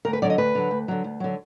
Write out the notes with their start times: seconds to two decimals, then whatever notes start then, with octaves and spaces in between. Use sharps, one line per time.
0.05 D2 A#4
0.13 B4
0.22 D3 F#3 D5
0.30 D#5
0.38 D2 B4
0.55 D3 F#3
0.71 D2
0.88 D3 F#3
1.04 D2
1.20 D3 F#3